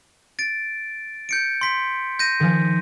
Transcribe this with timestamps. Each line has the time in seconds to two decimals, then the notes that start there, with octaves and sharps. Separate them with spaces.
0.39 A6 D7
1.29 G6 C#7 D7
1.61 C6 B6
2.19 G6 A#6 D#7
2.40 D#3 F3 G#5